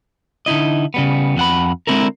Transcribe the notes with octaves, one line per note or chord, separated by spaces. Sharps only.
D3 D#4 E4 D#5
C#3 G3 B3
F2 F#5 B5
D3 G#3 C4 E4 A4 A#4